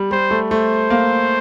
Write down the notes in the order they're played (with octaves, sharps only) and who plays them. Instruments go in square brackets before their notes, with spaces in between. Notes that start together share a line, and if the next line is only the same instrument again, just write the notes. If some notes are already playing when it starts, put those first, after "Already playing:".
Already playing: [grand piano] G3
[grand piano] G3 [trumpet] C5
[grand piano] A3
[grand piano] A3 [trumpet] C5
[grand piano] A#3